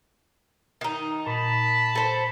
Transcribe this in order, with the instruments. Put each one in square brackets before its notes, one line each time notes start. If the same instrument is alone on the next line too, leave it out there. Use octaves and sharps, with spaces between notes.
[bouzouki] D#3 D#4
[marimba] A#2 [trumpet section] A5 B5
[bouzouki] A4 C5